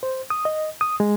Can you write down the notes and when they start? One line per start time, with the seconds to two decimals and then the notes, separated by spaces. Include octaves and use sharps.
0.03 C5
0.30 D#6
0.45 D#5
0.81 D#6
1.00 G#3